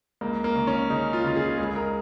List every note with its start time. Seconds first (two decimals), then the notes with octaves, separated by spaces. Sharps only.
0.21 C#2 A#3
0.44 A#3
0.55 C#3
0.67 C#4
0.90 C#3 D#4
1.13 F4
1.24 C#3 F4
1.36 G#4
1.58 C#2 G#4
1.76 A#4